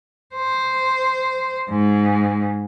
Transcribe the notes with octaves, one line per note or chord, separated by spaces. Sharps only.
C5
G#2